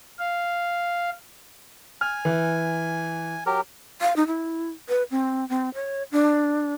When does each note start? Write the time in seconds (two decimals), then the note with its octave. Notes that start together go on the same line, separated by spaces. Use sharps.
0.19 F5
2.01 G#5 F6
2.25 E3
3.46 F#3 G4 A#4
4.01 F5
4.16 D#4
4.27 E4
4.89 B4
5.11 C4
5.49 C4
5.74 C#5
6.12 D4